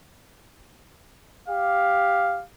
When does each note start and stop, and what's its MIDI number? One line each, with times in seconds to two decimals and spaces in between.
1.49 2.42 67
1.49 2.42 77